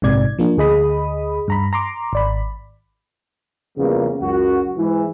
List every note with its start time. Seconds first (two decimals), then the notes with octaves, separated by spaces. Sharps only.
0.02 A#1 G#2 C3 D5 G#6
0.39 F3 A#3 D4
0.57 D2 G#4 D#5 B5 D#6
1.48 G2 A#5 B5
1.73 A#5 C6 D6
2.13 G#1 D5 B5
3.78 E2 C#3 F3 G3 A#3 B3
4.21 C#2 F#2 F#4
4.77 G#2 E3